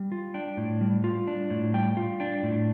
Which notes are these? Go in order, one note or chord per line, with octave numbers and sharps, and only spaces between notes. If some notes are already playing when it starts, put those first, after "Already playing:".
Already playing: G3
F4
D4 G5
A2
G3
F4
D4
A2
G3 G5
F4
D4 G5
A2